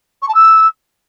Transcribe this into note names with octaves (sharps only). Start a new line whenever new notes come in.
C#6
A5
E6